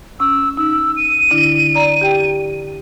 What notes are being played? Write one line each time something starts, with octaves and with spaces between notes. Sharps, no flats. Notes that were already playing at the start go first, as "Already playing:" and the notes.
C#4 E6
D#4 E6
D#7
D3 D4 E4
D5 A#5
G4 G5